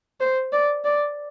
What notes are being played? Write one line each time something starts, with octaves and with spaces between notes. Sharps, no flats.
C5
D5
D5